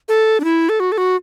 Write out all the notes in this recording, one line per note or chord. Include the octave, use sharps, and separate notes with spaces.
A4
D4
E4
A4
F#4
A4
F#4